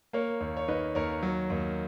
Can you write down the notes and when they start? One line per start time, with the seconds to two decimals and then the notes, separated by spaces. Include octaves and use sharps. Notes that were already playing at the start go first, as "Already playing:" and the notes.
0.13 A#3 A#4 C#5
0.41 D#2
0.57 C#5
0.68 D#3 B4 D#5
0.95 D#2 A#4 C#5
1.23 F#3
1.50 D#2